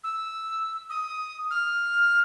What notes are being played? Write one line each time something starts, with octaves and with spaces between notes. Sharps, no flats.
E6
D#6
F6